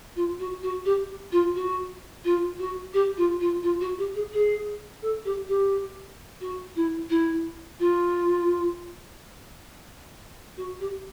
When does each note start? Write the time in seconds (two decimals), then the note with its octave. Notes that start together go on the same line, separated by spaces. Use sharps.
0.15 F4
0.39 F#4
0.62 F#4
0.85 G4
1.31 F4
1.55 F#4
2.24 F4
2.59 F#4
2.93 G4
3.17 F4
3.40 F4
3.62 F4
3.80 F#4
3.98 G4
4.14 G#4
4.32 G#4
5.01 A4
5.24 G4
5.48 G4
6.40 F#4
6.75 E4
7.09 E4
7.79 F4
10.57 F#4
10.80 G4